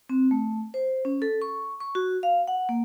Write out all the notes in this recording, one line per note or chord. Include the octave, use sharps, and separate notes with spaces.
C4
A3
C5
C#4
A4
C#6
C#6
F#4
F5
F#5
A#3